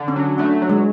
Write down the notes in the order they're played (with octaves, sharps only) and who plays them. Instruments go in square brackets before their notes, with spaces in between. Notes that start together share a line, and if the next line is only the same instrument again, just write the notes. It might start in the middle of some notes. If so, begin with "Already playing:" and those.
Already playing: [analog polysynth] D3
[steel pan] C#4
[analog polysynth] F#3
[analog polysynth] A3 [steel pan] D4
[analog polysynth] F#3
[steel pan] G#3